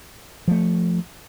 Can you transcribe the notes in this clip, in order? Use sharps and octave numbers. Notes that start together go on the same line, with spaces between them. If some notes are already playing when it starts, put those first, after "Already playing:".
F3 A3